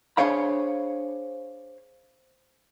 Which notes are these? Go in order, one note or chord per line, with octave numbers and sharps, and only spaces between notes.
D4 G#4 C5 C#5 F5 B5